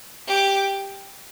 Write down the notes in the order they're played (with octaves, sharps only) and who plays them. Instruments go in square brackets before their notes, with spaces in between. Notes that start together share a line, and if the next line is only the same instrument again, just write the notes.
[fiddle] G4